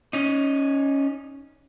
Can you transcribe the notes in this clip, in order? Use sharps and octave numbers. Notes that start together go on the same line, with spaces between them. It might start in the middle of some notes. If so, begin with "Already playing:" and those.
C#4 D#4